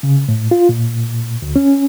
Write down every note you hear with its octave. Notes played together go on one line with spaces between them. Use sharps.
C#3
A2
F4
A#2
D2
C#4